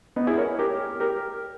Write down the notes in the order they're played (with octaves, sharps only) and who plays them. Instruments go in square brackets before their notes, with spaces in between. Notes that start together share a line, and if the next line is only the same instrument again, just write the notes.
[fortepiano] B3 D#4
E4 G#4
A#4 C#5
G4 A#4
G4 A#4